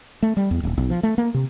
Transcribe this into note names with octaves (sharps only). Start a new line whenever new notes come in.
A3
G3
E2
D#1
B1
F3
A3
A#3
C3